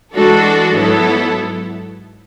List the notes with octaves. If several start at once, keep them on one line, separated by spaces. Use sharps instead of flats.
E3 G#3 D4 F#4 A4
G#2 F#3 B3 E4 A4